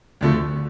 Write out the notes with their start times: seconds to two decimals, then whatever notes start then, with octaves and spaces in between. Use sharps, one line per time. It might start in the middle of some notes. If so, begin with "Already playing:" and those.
0.21 D2 D3 F3 A3